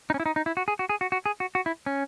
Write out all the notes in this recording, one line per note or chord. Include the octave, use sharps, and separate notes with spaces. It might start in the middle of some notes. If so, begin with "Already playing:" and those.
D#4
C#4
E4
D#4
D#4
E4
F#4
G#4
F#4
G#4
F#4
F#4
G#4
F#4
F#4
E4
C#4